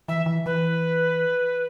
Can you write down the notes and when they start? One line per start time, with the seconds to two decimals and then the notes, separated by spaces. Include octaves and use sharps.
0.08 E3 E5
0.26 E3
0.46 E3 B4